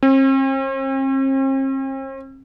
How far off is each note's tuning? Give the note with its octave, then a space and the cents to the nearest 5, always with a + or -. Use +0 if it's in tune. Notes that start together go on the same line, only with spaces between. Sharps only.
C4 +45